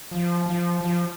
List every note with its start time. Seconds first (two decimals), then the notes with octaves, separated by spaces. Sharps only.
0.11 F3
0.46 F3
0.81 F3